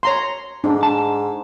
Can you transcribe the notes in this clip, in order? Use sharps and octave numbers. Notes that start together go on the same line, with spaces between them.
C#5 A#5 C6
G#2 D4
A5